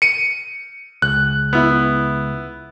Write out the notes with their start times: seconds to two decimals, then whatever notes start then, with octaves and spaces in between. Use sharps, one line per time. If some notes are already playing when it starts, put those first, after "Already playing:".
0.02 C#7 D#7
1.02 C#2 F#6
1.53 B3 E4